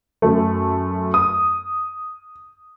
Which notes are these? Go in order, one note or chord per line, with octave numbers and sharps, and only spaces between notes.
F#2 A3
D#6